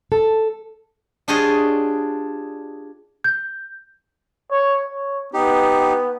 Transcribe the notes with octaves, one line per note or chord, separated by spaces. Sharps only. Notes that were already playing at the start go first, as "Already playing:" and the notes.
A4
D4 F4 G4 G#4 C#5 D#5
G6
C#5
C#5
B3 D#4 G4